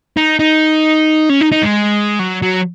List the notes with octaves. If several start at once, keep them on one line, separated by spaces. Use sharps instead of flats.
D#4
D#4
C#4
D#4
D#4
G#3
F#3
F#3